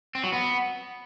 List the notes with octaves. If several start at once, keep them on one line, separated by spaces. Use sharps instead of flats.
C4
F#3
B3